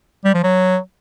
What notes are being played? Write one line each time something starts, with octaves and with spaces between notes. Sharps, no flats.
G3
F3
F#3